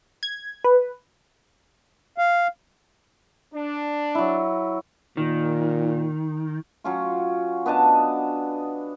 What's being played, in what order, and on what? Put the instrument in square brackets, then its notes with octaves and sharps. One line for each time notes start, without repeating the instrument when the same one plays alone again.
[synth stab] G#6
B4
[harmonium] F5
[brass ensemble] D4
[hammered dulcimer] F#3 E4
[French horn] A#2 [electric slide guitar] D#3
[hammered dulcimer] F#3 C#4 F4
B3 D4 D#5 A5